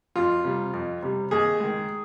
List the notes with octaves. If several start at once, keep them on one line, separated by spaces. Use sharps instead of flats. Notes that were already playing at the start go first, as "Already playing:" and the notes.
F2 F4
C3 G3
F2
C3 G3
D#2 G#4
D#3 G#3